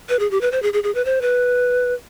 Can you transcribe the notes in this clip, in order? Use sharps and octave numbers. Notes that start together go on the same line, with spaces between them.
B4
G#4
G4
B4
C5
G#4
G#4
G#4
B4
C5
B4